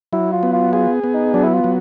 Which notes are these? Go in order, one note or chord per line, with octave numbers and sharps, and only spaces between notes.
F#3 E4
F4
B3
F4
F4 G#4
B3
D#4
F#3 D4
E4
F4
F#3